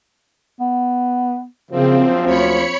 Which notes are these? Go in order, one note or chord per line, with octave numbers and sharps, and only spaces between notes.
B3
A#1 F#2 C#3 F3 C4
D2 C#5 B5 C#7